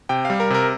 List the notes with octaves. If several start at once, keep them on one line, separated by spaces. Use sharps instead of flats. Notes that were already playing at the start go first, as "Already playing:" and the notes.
C3 G5
G3 F5
A#4
C3 A#4